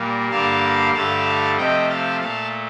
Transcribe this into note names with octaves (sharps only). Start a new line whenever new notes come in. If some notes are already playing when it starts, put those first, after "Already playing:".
Already playing: A#2 G3 A#3
G2 D3 G3 A#3 F5 A5
G2 D3 A3 F5 A5
C3 F3 A3 D#5 G5
F5 A5
A#2 A3 F5 A5